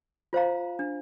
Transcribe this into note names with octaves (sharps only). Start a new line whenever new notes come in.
F4 C5 F5 A#5
D4